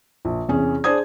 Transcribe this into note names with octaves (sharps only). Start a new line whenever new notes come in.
A#1
E2 C3 C#4 G#4
D4 G#4 C5 D5 D#6 G#6